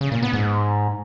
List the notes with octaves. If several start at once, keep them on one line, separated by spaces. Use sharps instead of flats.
C#3
A#2
B3
G#2